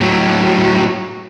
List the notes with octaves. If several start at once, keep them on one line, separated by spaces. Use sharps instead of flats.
A2 F#3